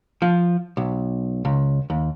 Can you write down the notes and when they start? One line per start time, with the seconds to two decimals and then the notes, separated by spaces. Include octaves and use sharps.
0.22 F3
0.77 B1
1.45 C#2
1.90 D#2